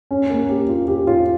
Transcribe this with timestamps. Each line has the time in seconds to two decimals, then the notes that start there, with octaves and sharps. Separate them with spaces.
0.11 C#4
0.30 A#3
0.49 G4
0.69 F4
0.88 G4
1.07 F4